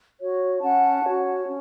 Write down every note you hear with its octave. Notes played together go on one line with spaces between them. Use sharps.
F#4 C#5
C#4 F#5 A5
F#4 C#5
C#4